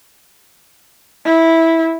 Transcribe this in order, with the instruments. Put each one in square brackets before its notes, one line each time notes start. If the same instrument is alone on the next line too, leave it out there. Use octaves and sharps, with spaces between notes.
[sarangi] E4